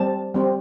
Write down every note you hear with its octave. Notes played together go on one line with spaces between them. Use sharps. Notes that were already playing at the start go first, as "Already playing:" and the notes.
Already playing: G3 C4 G4 A5
G3 C4 G4